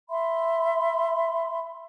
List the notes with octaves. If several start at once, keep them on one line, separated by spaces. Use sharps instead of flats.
E5 B5 C6